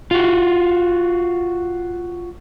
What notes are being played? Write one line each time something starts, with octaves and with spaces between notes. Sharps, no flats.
F4 F#4